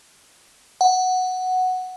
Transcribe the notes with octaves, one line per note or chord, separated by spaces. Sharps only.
F#5